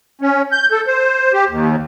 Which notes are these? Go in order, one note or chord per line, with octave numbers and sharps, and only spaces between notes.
C#4
G6
A4
C5
G4
D#2